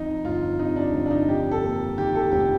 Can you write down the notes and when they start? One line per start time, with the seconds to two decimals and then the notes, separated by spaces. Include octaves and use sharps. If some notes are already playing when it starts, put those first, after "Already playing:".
Already playing: F2 D#4
0.24 G1 F4
0.58 C3 D#4
0.76 D4
0.93 G1
1.06 D4
1.11 D#4
1.29 F2 G4
1.51 A4
1.63 A#3
1.97 D#3 G4
2.15 A4
2.32 F1 G4